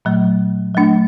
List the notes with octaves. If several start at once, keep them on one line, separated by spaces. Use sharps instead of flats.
A#2 F#3 A3
F#3 A3 D4